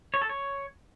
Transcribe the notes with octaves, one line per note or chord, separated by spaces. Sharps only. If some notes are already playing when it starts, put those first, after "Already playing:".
C#5
A4
C#5